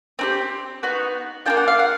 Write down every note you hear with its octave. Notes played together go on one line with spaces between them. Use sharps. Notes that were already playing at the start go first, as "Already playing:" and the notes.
C4 D#4 G4
B3 D#4 F#4
A#3 D4 F4 G5
F#5
F5
F#5